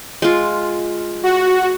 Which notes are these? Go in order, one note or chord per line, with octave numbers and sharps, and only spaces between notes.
G#3 F4
F#4